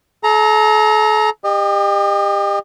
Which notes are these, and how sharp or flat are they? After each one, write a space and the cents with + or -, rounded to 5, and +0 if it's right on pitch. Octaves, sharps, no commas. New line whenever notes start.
A4 -40 A#5 +0
G4 +30 D#5 -30